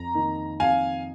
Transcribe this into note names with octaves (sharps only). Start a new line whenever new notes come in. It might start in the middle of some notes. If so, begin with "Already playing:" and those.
Already playing: F2 A#5
D#3 A#3 D#4
F2 F5 G#5